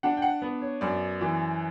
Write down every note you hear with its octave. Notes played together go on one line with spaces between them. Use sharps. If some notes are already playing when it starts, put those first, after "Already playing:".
D4 F#5
G5
F#5
B3
C#5
F#2 D5
E3